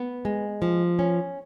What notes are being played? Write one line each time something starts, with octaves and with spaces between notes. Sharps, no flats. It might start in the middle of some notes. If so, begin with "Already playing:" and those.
Already playing: B3
G#3
F3
C#4